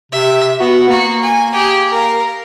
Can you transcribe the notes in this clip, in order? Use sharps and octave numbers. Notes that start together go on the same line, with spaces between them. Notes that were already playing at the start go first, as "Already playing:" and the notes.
C3 E5
B3 F#4
A#3 F#4
G#5
G4 G#4
A#4 F5